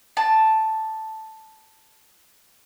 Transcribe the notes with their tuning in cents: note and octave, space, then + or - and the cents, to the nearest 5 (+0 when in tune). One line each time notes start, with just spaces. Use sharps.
A5 +0 D6 +40